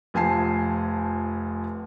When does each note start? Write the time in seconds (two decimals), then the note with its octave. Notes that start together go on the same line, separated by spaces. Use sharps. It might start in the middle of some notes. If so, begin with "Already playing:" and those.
0.14 F1 F3 G#5 A5 C7